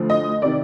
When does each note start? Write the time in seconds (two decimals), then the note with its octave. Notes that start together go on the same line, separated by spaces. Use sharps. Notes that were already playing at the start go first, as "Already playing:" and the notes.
Already playing: D2 D3 F3
0.10 D#5
0.42 C3 D#3 D5